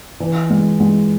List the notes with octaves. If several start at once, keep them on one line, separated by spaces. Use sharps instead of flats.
E3
G#3
G#3